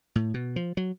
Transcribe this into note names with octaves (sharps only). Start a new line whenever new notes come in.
A2
B2
F3
F#3